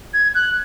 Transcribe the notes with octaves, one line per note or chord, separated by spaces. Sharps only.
G#6
F#6